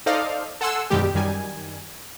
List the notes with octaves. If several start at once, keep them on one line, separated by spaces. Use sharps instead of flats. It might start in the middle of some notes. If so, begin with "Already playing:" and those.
D#4 A4 C5 D5 D#5 F5
A4 F#5 G#5 C6 E6
F#2 B2 D#3 G3 G#3 G4
F#2 D#3 G3 G#5